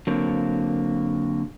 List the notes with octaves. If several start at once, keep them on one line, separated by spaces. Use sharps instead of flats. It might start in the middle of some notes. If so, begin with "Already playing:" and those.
D3 F#3 A#3 C4